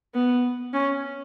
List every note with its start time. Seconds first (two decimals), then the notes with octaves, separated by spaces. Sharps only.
0.15 B3
0.74 C#4